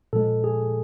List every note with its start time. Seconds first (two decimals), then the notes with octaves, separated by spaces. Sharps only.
0.13 A#2 F3 G#3 A4
0.44 G#4